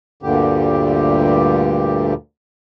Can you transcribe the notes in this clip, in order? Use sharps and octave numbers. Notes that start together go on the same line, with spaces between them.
D2 G2 A#2 D3 G4